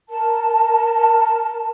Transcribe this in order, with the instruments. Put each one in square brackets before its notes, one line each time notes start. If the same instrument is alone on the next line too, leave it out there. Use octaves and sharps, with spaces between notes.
[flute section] A#4 A5